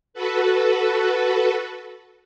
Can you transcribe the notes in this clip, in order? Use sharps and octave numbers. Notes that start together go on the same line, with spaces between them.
F#4 A4 B4